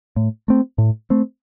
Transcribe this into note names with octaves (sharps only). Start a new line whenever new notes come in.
A2
A3 C4
A2
A3 C4